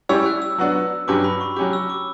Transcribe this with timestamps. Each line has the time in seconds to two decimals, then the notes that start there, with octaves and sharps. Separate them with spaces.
0.09 G3 C#4 E4 G4 C#5 E6
0.26 F#6
0.42 E6
0.58 F#3 B3 D4 F#4
1.07 G2 F#3 C#4 G4 B4 D6
1.24 B5
1.41 C#6
1.56 F#3 C#4 G4 D6
1.73 E6
1.90 D6